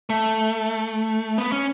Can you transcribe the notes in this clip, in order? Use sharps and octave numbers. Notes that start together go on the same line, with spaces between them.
A3
B3
C#4